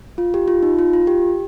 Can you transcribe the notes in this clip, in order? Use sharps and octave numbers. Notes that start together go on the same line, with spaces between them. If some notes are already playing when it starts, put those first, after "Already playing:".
F4
G4
F4
D#4
F4
F4
G4